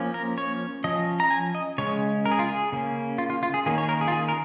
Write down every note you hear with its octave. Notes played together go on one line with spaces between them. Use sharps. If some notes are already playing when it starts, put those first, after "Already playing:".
Already playing: F3 A#3 C#4
A#4
C#5
F3 C#4 D#5
A#5
G#5
D#5
C#3 G#3 C#4 C#5
A#4
G#4
F4
G#4
C#3 A#3 C#4
F4
F4
F4
G#4
D#3 A#3 C#4 G#4
C#5
A#4
G#4
F4
G#4
A#4